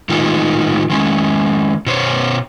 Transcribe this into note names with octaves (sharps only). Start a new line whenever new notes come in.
A2 D#3 G#3 D#4 F4
D#3 G#3 C#4
B2 C5 C#5